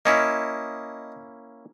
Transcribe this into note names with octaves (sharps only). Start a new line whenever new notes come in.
A#3 C#4 E4 D#5 A5